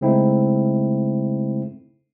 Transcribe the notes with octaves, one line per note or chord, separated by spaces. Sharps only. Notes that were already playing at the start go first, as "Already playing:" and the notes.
C#3 G#3 A3 C4 D#4 E4